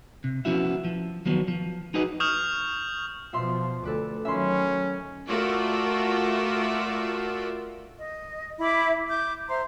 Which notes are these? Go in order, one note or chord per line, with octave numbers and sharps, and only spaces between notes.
C3
F3 B3 C#4 E4 F#4 E5
F3
D#3 F3 F#3 B3
F3
D#4 F#4 G#4 B4 D#5
C#6 D#6 F6 G6 F7
B2 F3 F4 E5 C6
D2 A4 B4 D6
D#3 F#3 C#4 E5 B5 C6
A3 F4 F#4 A#4 D5 E5
D#5
E4 E5 B5 D6
D6 G6
C5 E5 A#5 C6